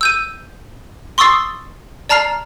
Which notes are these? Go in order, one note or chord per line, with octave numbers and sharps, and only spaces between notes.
E6 G6 D#7
C6 C#6 D#6 E6 A6 C7
D5 A5 A#5 F6 C7 F7